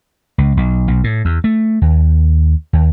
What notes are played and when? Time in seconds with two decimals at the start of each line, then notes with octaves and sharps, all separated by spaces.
0.38 C#2
0.57 B1
0.88 B1
1.04 A2
1.25 E2
1.44 A3
1.82 D#2
2.73 D#2